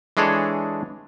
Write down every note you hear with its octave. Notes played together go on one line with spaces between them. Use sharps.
E3 G#3 D4 G#4 A4 C#5